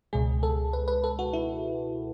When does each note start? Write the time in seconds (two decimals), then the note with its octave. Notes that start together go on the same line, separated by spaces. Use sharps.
0.13 C#2 B2 G#3 G#4
0.43 A4
0.73 B4
0.88 B4
1.04 A4
1.19 F#4
1.33 E4